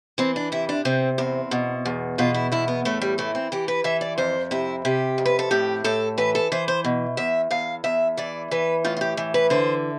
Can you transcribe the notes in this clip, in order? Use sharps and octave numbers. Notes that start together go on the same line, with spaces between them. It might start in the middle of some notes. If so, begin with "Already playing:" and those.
E3 C4
D4
C3 E4
D4
C3 C4
E2 C4
B2
E2
B2 F4
E4
E2 E4
B3
A2 A3
G3
E3 A3
C4
E3 G4
B4
E3 E5
D5
F2 C5
C3 E4
C3 G4
F2
B4
A4
A2 G4
A2 A4
E3 B4
A4
E3 C5
C5
B2
E2 E5
E2 F5
E2 E5
E3 D5
E3 B4
A2 F4
F4
G4
E3
B4
D3 C5